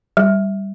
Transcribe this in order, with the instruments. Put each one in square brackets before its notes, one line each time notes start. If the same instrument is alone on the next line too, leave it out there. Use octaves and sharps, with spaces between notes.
[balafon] G3